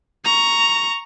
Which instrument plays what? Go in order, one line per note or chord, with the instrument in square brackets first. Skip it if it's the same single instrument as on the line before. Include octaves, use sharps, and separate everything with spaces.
[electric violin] A#5 C#6